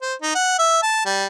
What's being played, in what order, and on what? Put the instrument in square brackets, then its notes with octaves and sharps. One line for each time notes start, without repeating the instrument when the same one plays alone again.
[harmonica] C5
D#4
F#5
E5
A5
G3